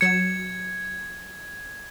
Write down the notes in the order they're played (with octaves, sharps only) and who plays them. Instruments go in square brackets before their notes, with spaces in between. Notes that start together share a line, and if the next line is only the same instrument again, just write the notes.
[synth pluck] F#3 E7 [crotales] G#6 [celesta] C#7